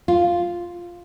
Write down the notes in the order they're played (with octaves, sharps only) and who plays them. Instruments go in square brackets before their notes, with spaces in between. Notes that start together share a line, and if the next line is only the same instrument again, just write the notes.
[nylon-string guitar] F4